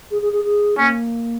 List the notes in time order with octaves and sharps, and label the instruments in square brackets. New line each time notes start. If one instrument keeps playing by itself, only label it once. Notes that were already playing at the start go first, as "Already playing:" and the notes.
[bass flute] G#4
G#4
G#4
G#4
[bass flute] A#3 [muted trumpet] C#4